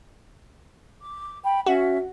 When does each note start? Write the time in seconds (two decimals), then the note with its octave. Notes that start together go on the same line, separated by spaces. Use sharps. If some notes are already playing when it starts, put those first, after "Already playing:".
1.02 D6
1.44 G5 B5
1.66 C#4 F#4 E5